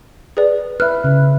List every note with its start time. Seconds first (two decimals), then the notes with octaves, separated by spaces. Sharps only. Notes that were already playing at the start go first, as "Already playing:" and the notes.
0.37 G#4 B4 D5
0.80 B4 E5 F6 F#6
1.04 C#3